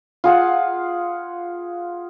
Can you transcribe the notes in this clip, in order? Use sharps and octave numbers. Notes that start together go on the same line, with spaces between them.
F4 G#4 F#5